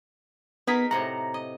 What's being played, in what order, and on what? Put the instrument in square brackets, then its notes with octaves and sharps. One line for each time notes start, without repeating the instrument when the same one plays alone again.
[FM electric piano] B3 B6 [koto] D#4 G#4 A#4
[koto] A2 C3 F#5 [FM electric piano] A#5
[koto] D#5